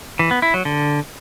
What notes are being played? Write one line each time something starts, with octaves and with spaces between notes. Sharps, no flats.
E3
B3
E4
F#3
D3